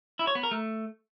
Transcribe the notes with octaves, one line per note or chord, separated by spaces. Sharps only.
E4
C#5
B3
A#4
A3